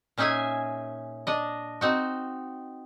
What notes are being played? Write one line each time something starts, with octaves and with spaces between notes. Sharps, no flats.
A#2 C#4 D#4 G#4 E5 G#5
D4 D#5
C4 D#4 F#4